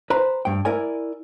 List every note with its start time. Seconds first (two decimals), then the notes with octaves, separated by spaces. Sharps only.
0.10 B4 C5 A#5
0.45 G2 G5
0.65 E4 A#4 D5 G#5